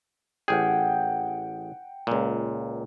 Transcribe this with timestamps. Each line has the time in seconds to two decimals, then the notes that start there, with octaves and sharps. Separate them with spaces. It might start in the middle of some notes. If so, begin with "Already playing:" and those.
0.48 A1 G#4 F#5 G5
2.07 C#2 A#2